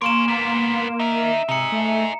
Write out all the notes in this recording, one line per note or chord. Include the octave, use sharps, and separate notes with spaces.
A#3 G#4 C#5 C6 D7 E7
G#2 B3
D#4 A#4 E5
C3 D#4 G#4 A#5 C#7
A3